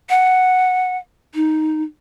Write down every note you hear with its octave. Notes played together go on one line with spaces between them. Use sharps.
F#5
D#4